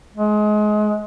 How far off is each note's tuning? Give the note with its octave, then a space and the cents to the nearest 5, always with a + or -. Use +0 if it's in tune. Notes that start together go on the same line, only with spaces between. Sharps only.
G#3 +25